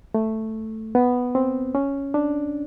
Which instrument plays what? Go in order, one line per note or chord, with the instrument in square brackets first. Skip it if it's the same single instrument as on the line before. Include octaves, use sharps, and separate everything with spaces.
[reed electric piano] A3
B3
C4
C#4
D4